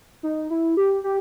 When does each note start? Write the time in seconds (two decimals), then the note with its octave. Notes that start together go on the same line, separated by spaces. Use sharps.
0.23 D#4
0.50 E4
0.77 G4
1.04 G4